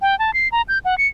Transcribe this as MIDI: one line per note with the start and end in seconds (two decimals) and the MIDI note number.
0.02 0.18 79
0.19 0.33 81
0.34 0.48 96
0.52 0.62 82
0.68 0.79 91
0.85 0.97 78
0.98 1.07 97